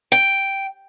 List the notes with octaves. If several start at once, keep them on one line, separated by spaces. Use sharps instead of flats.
G5